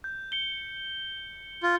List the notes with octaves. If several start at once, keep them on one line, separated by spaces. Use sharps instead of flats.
G6
C#7 G7
F4